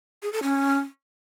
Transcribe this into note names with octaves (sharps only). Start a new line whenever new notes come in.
G#4
A4
C#4